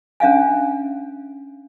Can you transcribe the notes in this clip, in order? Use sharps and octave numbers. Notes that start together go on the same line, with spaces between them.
C#4 D4 E5 F5 G#5